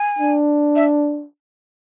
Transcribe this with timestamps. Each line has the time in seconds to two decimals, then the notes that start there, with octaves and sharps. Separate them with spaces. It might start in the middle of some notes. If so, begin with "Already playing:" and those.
Already playing: G#5
0.19 D4
0.76 E5